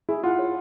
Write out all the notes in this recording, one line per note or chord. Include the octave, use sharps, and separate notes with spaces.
E4 G#4
F4 F#5
C#5